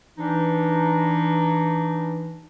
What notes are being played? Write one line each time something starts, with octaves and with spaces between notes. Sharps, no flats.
E3 D4 D#4